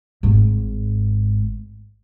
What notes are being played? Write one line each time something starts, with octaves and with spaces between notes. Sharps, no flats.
G#1 G#2